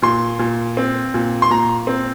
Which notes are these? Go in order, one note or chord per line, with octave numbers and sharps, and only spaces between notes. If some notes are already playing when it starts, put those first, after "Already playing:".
A#2 C6
A#2
C4
A#2
C6
A#2 A#5
C4